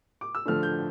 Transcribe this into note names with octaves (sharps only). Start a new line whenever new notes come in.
D6
E6
D3 F3 A3 D4 F6
G6